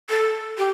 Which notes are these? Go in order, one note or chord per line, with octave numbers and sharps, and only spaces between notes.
A4
G4